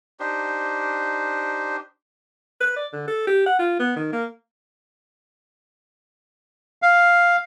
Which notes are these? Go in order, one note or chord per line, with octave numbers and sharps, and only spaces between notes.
D4 D#4 G4 C5
B4
D5
D3
A4
G4
F#5
F4
B3
D#3
A#3
F5